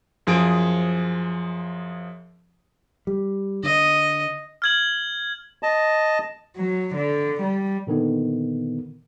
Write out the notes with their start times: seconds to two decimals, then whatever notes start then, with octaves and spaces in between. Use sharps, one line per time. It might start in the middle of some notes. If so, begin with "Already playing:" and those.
0.27 F#2 F3 G#4 D7
3.07 G3
3.63 D3 D#5
4.62 F6 G#6 F#7
5.63 D#5 A5
6.56 F#3
6.96 D3
7.42 G3
7.87 A#2 D3 D#3 B3